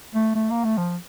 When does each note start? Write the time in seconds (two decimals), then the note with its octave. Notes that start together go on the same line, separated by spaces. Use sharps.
0.15 A3
0.36 A3
0.50 A#3
0.65 A3
0.78 F3